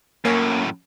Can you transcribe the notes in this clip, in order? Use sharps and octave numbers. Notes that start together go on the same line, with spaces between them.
F#2 A2 A#3 C#4